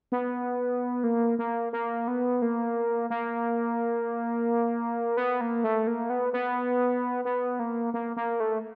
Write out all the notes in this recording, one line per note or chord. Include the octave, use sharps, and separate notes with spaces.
B3
A#3
A#3
A#3
B3
A#3
A#3
B3
A#3
A3
A#3
B3
B3
B3
A#3
A#3
A#3
A3